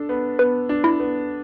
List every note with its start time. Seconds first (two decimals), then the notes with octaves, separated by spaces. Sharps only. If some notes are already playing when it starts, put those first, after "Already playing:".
Already playing: D4 A4
0.09 B3
0.39 B3 B4
0.69 D4
0.84 E4
1.00 B3